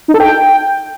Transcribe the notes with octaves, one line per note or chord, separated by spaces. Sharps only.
D#4
A4
G5